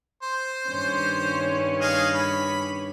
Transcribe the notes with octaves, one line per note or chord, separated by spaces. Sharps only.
C5
G2 D#3 C#4
G#4 D#5 F5
B5